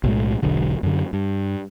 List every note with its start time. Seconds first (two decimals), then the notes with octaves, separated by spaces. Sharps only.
0.04 B1 A2 G#3
0.42 E1 B1 D3
0.83 F#2 D3
1.13 G2